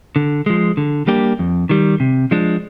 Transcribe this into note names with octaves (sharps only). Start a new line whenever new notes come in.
D3
F3 G#3
D3
G3 A#3 D4 G4
F2
D#3 G3
C3
F3 G#3 D4